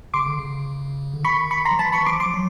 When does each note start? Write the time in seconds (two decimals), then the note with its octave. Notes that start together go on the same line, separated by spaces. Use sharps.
0.14 C#3 C6 D6
0.26 D3
0.39 C#3
1.14 D3
1.23 D#3 B5 C#6
1.51 B5 C#6
1.65 A#5 C6
1.71 F3
1.79 E3 A5 B5
1.92 E3 B5 C#6
2.06 F3 C6 D6
2.20 C6 D6
2.26 F3
2.34 F#3